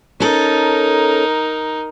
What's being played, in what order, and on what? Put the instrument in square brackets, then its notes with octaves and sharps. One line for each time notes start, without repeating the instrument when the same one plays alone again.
[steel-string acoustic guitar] C#4 A4 [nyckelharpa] D#4 A#4